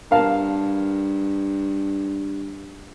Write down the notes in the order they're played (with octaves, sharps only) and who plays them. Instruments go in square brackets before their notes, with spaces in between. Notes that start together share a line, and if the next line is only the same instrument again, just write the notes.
[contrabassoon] G2 [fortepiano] A#4 F5 A5